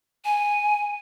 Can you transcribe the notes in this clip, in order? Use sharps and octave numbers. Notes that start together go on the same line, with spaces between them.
G#5